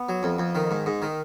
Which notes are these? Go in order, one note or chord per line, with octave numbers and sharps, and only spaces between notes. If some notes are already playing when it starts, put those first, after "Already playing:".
Already playing: B3
F#3
F2
F2
D#3
G#2
G#2
D#3